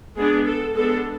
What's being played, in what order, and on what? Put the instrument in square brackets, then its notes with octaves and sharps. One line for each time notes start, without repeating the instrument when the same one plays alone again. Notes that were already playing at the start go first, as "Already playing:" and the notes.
[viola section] G#3 B3 D4 G#4
A4
G#3 B3 D4 A4